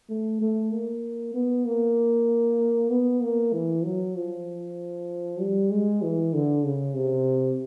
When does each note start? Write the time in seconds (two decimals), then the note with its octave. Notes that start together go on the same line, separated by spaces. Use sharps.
0.10 A3
0.41 A3
0.73 A#3
1.34 B3
1.65 A#3
2.90 B3
3.22 A#3
3.53 E3
3.85 F#3
4.16 F3
5.40 G3
5.71 G#3
6.02 E3
6.34 D3
6.64 C#3
6.95 C3